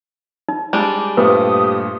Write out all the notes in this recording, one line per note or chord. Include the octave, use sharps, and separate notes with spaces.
D#4
G3 G#3 D4
G2 A#2 A3 G4 B4 C5 D#6